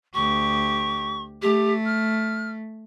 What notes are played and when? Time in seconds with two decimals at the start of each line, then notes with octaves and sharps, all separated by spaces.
0.14 D2 G4 C#6
1.42 A3 G4
1.85 F6